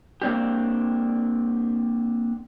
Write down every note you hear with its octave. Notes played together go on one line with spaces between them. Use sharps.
A#3 C4 D4 G4